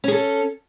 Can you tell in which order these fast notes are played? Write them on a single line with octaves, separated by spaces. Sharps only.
C#4 G#4 A4